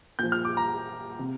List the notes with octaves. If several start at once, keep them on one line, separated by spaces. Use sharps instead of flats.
A#2 F3 G6
F6
D6
A#5
C3